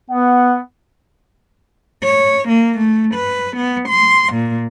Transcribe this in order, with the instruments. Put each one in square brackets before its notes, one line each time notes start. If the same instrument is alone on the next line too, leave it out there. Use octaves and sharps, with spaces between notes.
[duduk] B3 [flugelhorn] F#5
[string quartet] C#5
A#3
A3
B4
B3
C6
A#2